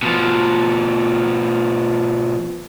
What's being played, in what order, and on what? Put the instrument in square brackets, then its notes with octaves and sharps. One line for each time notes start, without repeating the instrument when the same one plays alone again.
[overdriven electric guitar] B2 F3